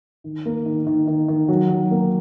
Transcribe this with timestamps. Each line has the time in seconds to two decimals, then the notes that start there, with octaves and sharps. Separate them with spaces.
0.24 D#3
0.46 A#3
0.66 D#3
0.87 D#3
1.07 D#3
1.28 D#3
1.48 F#3
1.69 F#3
1.91 A#3